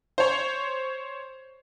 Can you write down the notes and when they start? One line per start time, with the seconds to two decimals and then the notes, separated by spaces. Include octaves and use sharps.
0.18 C5 C#5